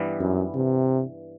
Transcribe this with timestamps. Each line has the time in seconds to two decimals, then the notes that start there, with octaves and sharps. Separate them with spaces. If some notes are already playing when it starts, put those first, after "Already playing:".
Already playing: G2 E3 G3 B3
0.20 F#2
0.54 C3